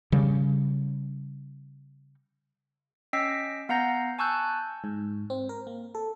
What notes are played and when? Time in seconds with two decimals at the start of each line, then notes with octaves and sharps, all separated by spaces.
0.12 C#3 G3
3.13 C#4 D#5 G5 E6 B6 C7
3.69 B3 F5 F#5 A#5 G6 A#6
4.19 G#5 A5 C#6 E6 F#6 G6
4.84 G#2
5.30 C4
5.49 A#4
5.67 A#3
5.95 A4